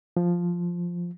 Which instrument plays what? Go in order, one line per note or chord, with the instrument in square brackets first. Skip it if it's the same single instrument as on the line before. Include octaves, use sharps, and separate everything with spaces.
[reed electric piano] F3